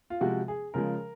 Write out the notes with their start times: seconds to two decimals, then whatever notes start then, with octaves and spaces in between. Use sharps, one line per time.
0.10 F4
0.21 C3 F3 G#3 F#4
0.48 G#4
0.74 C#3 F3 G#3 A#4